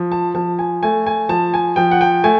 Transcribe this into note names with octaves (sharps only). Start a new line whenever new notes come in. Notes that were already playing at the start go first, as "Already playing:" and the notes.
Already playing: F3
A5
F3 A5
G#5
A3 G#5
G#5
F3 A5
G#5
F3 G5
F#5
G5
A3 G#5